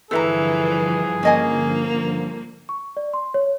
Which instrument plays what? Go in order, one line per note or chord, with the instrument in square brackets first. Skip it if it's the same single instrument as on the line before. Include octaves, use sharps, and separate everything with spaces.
[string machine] G2 D3 F3 [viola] E3 [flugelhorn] G#4 [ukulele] A4 E5 A#5
[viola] A#3 [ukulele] C#4 D#5 G#5
[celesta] C#6
D5
C6
C#5